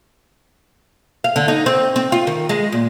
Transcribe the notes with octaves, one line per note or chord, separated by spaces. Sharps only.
F5
D3
D#4
C4
C4
F4
D#3
G#3
A#2